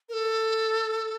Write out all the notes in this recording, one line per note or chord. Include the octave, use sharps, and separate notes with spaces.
A#4
A4